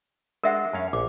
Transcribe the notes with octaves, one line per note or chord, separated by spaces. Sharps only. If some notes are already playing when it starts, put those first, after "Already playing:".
G#3 D4 A4 A#4 E5 F#5
F#2 C#4 F5
A#1 D6